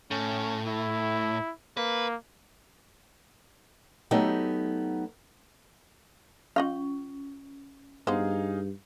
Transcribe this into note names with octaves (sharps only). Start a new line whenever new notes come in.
A2 C#4
E4
A#3 B4
F#3 A3 B3 D#4 G4
C#4 F4 D#5 F5 C#6
G2 B3 D#4 G#4 C5 F5